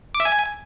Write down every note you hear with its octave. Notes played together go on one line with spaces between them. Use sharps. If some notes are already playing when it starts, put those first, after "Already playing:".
D6
E5
G#5